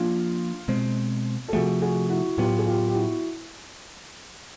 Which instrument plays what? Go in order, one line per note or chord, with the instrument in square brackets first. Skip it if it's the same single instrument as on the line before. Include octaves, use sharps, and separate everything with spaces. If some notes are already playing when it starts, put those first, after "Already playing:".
Already playing: [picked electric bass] F3 A#3 D4 [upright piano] F4
[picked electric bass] B2 G#3 C4
[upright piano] A4
[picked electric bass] C3 F3 A3 [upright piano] F#4 G#4
[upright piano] F#4 G#4
E4 F#4
[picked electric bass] A2 F#3 B3 [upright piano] F4 G4
[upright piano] G#4
F4 G4
G4
E4 F#4